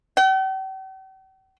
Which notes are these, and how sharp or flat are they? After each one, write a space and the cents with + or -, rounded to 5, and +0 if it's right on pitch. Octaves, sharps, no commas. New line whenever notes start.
G5 -45